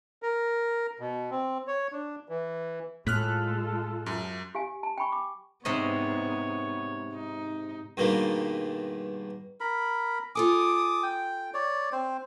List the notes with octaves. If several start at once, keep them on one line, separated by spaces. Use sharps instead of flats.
A#4
B2
C4
C#5
D4
E3
A2 G#3 F4 A4 F6 F#6 B6
F#2
G4 F5 G#5
A5
G5 G#5 B5 C#6
D6
G#2 C3 B3 C#5 D#5
D#4
G2 B2 D#3 G#3 A#3
A#4 B5
F4 A4 G#5 D6 D#6
G5
C#5 D5
C4 C5